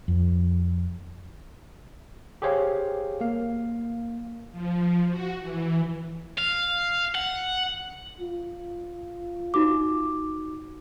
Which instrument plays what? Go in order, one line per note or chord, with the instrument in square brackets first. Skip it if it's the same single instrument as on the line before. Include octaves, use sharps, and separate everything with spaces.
[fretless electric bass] F2
[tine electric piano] G4 G#4 C5 C#5 F5
A#3 F5
[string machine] F3
F#4
E3
[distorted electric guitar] F5
F#5
[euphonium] F4
[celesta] D#4 F#4 D6